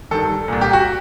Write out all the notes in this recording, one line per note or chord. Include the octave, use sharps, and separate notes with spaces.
G2 D#3 A4
C2 A#2
G4
F#4